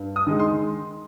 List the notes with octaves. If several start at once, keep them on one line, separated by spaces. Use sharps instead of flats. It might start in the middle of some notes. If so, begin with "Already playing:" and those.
Already playing: G2
D#6
D#3 G#3 D#4
C6